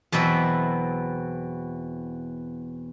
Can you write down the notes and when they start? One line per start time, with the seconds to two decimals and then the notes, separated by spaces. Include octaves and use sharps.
0.12 E2 B2 F#3 C4 E5